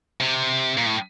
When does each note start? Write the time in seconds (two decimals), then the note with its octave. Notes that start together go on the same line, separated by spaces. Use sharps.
0.20 C3
0.77 A#2
0.86 A2